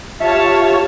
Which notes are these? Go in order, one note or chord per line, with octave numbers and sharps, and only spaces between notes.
F4 G4 C#5 E5 F5 A5